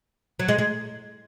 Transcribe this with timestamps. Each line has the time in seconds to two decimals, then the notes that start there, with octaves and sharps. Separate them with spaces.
0.39 F#3
0.48 G#3
0.58 G#3